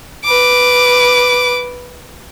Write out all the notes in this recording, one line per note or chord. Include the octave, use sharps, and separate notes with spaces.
B4 D6